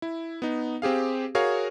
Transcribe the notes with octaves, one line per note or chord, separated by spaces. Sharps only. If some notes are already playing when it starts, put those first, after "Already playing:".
E4
B3 D#4
C4 G4 G#4 F5
F#4 G#4 A#4 C#5 F5